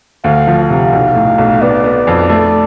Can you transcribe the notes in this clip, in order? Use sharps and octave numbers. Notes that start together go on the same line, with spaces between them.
D2 F5
F3
F5
C3
B1
A2
B1
B3 D5
B3
F2
A3